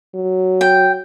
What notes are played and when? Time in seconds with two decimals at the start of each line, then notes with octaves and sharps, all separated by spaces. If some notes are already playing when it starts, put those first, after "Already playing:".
0.15 F#3
0.61 G5